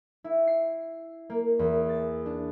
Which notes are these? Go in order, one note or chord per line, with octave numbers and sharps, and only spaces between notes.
E4
C7
A#3
E2
A6
D4